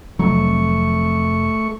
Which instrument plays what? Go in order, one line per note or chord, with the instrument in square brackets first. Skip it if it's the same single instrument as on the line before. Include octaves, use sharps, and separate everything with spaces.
[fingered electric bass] F1 F2 [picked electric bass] F#3 [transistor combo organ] A3 C#6